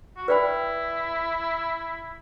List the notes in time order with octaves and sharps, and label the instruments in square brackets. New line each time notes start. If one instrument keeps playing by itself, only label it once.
[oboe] F#4
[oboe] E4 [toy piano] B4 D5 G5 B5